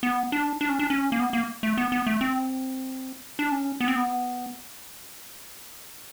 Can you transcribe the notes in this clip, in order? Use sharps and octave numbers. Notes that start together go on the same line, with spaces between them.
B3
D4
D4
C#4
D4
C#4
A#3
B3
A#3
A3
B3
B3
A3
C4
D4
C#4
B3
C4
B3